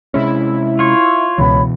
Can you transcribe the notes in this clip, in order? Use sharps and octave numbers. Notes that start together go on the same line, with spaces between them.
C3 G#3 C#4 E4
F4 C#5
C#2 B2 E3 C#5 B5